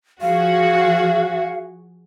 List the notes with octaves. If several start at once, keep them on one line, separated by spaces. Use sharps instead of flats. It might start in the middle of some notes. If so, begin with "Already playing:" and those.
F3 F#4 G#4 F5